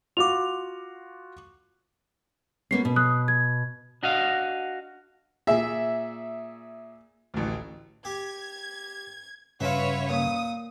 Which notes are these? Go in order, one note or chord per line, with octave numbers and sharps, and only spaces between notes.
F4 F#4 D6 F7
A#3 B3 C#4 C7
B2
D#6 F#6
G#6
D4 F#4 D#5 F5
A#2 G#4 E5
A1 D2
G4 G#6
G2 C#3 F4 F#4 B4 C#5 E5
A#2 D#6